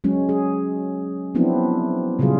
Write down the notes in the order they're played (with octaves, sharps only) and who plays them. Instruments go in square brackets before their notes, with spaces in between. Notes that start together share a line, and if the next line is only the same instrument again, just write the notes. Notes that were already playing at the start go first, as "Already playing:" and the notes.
[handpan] F#3 G#3 C#4
G#4
F3 F#3 B3 C4 D4 E4
A#2 C#3 F#3 G3 F4 G#4